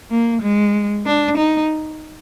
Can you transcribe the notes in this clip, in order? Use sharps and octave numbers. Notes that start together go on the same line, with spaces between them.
A#3
G#3
D4
D#4